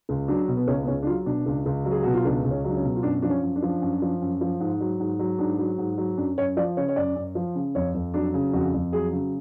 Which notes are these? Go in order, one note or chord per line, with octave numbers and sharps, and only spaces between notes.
C#2
F#3 D4
B2
B3
C#2 C#4
B3
C#2 C#4
D4
F#3 F4
B2 D4
C#2
C#2
F#3
G#4
B2 F#4
F4
C#2 D4
C#2
C#4
F#3 D4
C#4
B2
F4
F#2 D4
F3 D4
C#4
F#2
D4
F3
F#2
F3
F#2
F3
G#2
F#3
G#2
F#3
G#2 D4
F#3
G#2
F#3
F#2 D4
F#2 C#5
F3 D5
C#3 C#5
C#5
F#2 D5
F#2
F3
C#3
F2 C#5
F2
F#3 D4
C#3
F2 F#4
F2
F#3 G#4
C#3